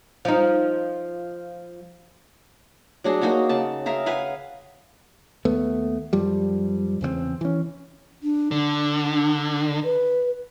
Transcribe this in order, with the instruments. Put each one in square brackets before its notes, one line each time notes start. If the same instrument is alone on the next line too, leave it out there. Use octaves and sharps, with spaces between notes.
[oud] F3 D#4
[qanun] F#3 D4 G#4
A#3 D#4 F#4 G#4
C#3 A5
G#4 A#4 E5 F5
B4 F5 F#5 G#5
[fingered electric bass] D#2 A3 B3
F#2 F3 G3
E2 C#3 A3 C4
E3 C#4
[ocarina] D4
[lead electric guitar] D3 [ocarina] D4
[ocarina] B4